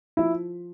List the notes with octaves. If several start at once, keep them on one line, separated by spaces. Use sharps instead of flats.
F3 E4